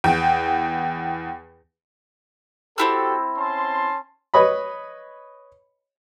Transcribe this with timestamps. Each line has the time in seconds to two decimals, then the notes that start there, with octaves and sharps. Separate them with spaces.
0.04 E2 G5
2.78 C4 E4 F#4 G4 A4 E6
3.37 C#4 A5 C6
4.34 B4 C#5 D#5 B5